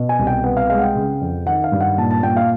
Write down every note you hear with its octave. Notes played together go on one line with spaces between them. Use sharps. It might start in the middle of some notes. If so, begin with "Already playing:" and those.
Already playing: B2
G#5
C2
G5
B3 F#5
F5
G#3 F5
F#5
G5
C#3
F2
D#3 F#5
F5
G2
F#5
A#2 A5
A5
A#2 G5
F5